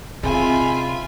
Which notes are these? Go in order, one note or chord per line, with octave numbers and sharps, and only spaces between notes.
C3 G#3 C4 F4 E5 G#5 B5